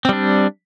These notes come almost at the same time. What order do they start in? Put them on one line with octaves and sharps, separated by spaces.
C4 G3 D4